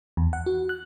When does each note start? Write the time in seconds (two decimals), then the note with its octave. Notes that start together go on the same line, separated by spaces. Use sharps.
0.17 E2
0.33 F#5
0.46 F#4
0.69 F#6